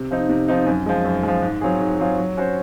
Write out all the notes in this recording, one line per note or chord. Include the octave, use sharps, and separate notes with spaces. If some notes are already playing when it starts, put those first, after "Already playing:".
Already playing: C3
F3 C4 D#4
C3
F3 C4 D#4
F#2
F3 G#3
F#2
F3 G#3
G#2
F#3 C4 F4 G#4
G#2
F#3 C4 F4 G#4
F#3
C#4 F#4 C5